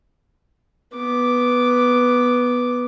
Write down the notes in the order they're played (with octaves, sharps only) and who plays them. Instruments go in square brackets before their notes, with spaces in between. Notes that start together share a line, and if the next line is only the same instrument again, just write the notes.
[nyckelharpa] B3 D6